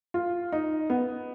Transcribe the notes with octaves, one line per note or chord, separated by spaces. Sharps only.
F4
D#4
B3